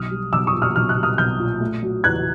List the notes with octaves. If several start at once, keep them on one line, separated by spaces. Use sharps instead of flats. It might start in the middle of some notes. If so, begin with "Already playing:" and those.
Already playing: B1 D#6 F6
G3
B1 D6 E6
C#6 D#6
A#2
D#6 F6
B1 F6
F#6
G3
D#6 F6
B1 F6 G6
A#2
A3
F#3
E2 F#6 G#6